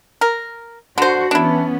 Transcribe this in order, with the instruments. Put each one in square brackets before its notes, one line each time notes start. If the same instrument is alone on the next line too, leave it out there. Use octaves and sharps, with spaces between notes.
[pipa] A#4
[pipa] D3 C5 [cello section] F#4
[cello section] E3 B3 C#4 [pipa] D4 E4